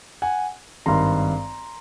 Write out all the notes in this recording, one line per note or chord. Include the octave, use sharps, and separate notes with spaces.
F#5 G#5
G#1 G2 D#3 A#5 C6